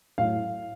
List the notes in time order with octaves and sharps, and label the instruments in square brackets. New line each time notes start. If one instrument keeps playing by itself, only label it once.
[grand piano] A2 F#3 F5